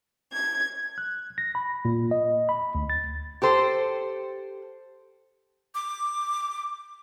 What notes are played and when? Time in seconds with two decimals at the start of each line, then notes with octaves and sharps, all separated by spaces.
0.32 G#6
0.98 F#6
1.38 A#6
1.55 B5
1.85 A#2
2.11 D#5
2.49 B5
2.75 D2
2.90 A6
3.42 G4 A4 C5
5.75 D6